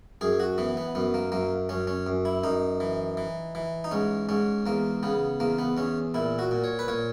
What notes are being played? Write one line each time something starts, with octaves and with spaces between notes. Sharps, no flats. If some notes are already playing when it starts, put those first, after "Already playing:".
F#2 G#4
F#4
E3 B3
B3
F#2 B3
A#3
F#2 A#3
F#2 C#4
C#4
F#2
E4
F#2 D#4
E3
E3
E3
D#4
G#2 C#4
G#2 C#4
E2 A#3
C#3 B3
E2 A#3
B3
E2 C#4
A#2 E4
F#4
A#2
C#5
B4
A#2 C#5